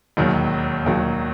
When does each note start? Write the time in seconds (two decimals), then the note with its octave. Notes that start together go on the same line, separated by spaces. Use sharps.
0.17 E1 D#2 D#3 F#3
0.85 E1 D#2 D#3 F#3